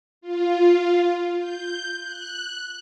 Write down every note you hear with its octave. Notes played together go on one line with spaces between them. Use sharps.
F4
G6
F#6